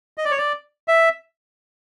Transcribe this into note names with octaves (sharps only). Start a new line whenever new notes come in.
D#5
D5
C#5
D5
E5